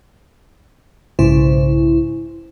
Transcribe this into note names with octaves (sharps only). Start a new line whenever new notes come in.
B1 G#2 C#3 E4 C5